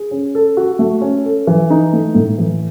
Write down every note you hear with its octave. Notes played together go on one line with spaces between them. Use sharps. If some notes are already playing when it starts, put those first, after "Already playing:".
Already playing: G#4
C#4
A4
F#4
A3
C#4
A4
E3
D#4
A3
A2
E3